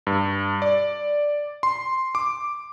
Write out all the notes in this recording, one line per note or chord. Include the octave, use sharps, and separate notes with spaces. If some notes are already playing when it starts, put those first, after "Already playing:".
G2
D5
C6
D6